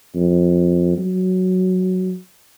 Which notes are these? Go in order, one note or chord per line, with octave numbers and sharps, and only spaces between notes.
F2
F#3